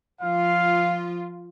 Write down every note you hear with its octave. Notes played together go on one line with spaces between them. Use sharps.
F3 F4 F5